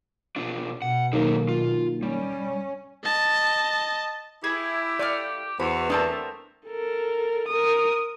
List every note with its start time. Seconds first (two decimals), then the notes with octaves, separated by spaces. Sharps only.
0.36 B2 D4 F4
0.82 B2 F#5
1.13 D#3 F#3 A#3 D#4 G#4 A4
1.48 F4
2.03 G3 C#4
3.04 D#5 A5
4.44 E4 G4 G#4
4.99 A3 D5 F5 F6
5.60 E2 E3 F#4 C5 B5
5.90 A3 B3 C4 D4 A#4 A5
6.67 A4 A#4
7.48 A#4 D#6